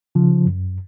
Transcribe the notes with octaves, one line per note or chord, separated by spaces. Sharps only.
C#3 F3
F#2